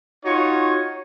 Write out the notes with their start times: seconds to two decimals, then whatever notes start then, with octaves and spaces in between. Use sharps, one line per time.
0.25 D#4 F4 F#4 C#5